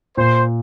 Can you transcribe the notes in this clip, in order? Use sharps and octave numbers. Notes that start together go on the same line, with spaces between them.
A#2 C5